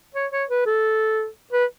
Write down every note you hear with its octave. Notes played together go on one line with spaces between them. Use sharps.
C#5
C#5
B4
A4
B4